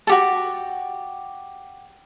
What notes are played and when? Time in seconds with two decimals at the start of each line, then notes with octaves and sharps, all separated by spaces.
0.07 F#4 G4 A4